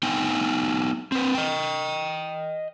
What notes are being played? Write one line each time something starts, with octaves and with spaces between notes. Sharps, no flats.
B3 D#4 G5 G#5
C4 B4
D#5 G5